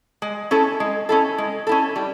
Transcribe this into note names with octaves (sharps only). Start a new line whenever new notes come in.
G#3
C#4 E4 A4
G#3
C#4 E4 A4
G#3
C#4 E4 A4
G3